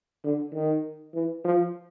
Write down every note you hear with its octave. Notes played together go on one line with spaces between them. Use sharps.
D3
D#3
E3
F3